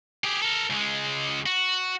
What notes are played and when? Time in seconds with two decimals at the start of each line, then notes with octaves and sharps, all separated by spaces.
0.24 G4 G#4
0.42 A4 A#4
0.70 C#2 G#3
1.46 F#4